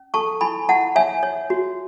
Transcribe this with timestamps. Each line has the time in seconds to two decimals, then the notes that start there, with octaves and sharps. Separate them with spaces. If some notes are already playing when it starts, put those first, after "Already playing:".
Already playing: C#4
0.14 A4 A5 C#6
0.41 E4 G#5 B5
0.69 E4 F#5 A5
0.96 C#5 E5 G#5
1.23 C#5
1.50 F#4